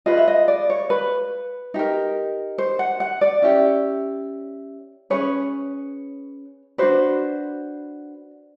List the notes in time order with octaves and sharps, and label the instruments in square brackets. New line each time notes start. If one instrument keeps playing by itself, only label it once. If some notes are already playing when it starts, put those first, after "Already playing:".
[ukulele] F4 G#4 B4 D#5
E5
D#5
D5
C#5
B4
D#4 G4 A#4
C5
F#5
F#5
D5
C#4 E4 G4
C#4 E4 G#4 B4 C#5
D4 F#4 B4 C5